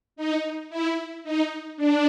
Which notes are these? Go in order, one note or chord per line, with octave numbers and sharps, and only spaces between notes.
D#4
E4
D#4
D4